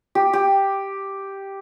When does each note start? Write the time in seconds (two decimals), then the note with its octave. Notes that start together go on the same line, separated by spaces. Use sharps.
0.15 G4
0.33 G4